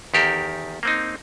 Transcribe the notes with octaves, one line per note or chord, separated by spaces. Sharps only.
E2 D#3 G4 A4 A#4
A#3 C4 D#4